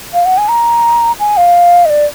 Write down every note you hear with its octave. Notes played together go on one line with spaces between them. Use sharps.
F5
F#5
G#5
A#5
G#5
F5
D#5
D5